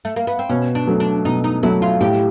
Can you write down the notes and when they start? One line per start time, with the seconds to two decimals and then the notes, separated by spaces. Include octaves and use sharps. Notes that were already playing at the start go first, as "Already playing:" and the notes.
0.05 A3
0.16 A#3
0.27 B3
0.39 C4
0.49 B2 C#4
0.75 D4
0.87 F#3 A3
1.00 D4
1.25 B2 D#4
1.44 D#4
1.63 F#3 A3 E4
1.82 F4
2.01 A2 G4